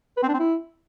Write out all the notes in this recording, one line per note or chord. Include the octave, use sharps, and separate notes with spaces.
B4
C4
D4
C4
E4